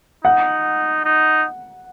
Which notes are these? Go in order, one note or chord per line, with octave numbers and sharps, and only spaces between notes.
D#4 F#5
D#4